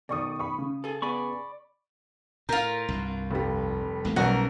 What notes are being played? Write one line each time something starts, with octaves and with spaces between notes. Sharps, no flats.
B2 D#3 D5 C#6 D#6
B5 C#6
C#3
G#4 A4
B3 G#4 D5 B5 C#6
A2 F4 A#4 G6
C2 G2
F1 G3
A1 G#3 A#3
B1 G3 B3 C#4 F#4 A#4 F#5